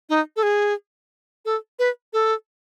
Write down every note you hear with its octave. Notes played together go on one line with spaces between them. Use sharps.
D#4
A4
G#4
A4
B4
A4